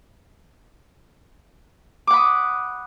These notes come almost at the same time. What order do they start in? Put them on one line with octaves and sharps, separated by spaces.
D6 F#5 B5 D#6